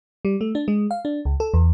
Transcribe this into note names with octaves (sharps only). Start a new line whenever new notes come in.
G3
A3
D4
G#3
F5
D4
C#2
A4
E2